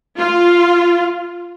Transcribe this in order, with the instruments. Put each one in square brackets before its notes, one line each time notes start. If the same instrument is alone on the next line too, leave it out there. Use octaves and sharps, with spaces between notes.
[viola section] F4